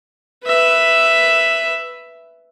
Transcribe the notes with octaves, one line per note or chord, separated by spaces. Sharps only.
B4 E5